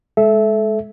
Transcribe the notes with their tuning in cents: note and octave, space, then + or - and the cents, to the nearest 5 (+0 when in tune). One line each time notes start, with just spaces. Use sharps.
G#3 +10 A4 -25 E5 +0